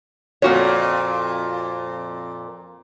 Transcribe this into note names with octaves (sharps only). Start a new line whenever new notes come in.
F2 A#2 A#3 F#4 C#5